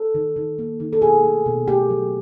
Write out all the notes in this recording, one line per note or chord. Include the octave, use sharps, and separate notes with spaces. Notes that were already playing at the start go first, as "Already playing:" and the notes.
Already playing: A4
D#3
D#3
A#3
D#3
A4
B2 G#4
A3
B2
A3 G4
F#3